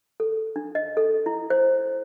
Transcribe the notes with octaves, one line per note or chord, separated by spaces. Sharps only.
A4
D4
D#5
A4
E4
C5